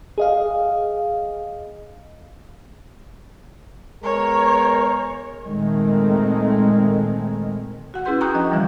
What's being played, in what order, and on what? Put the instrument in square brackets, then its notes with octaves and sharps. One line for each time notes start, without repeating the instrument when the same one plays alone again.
[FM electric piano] G#4 D#5 F5
[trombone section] G#3 B3 A#4 [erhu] C#5
[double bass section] A#2 D#3 G#3 A3 C4
[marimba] F#4 F#5
C#4 E4 G#4 B4 C6 G6
G5 A#5 C#6 D#6 F#6 G6
F3 D4 D#5
B2 D3 E3 F3 G3